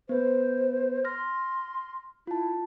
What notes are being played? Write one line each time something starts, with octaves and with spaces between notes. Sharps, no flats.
B3 B4 C5
C6 F6 A#6
E4 F4 A5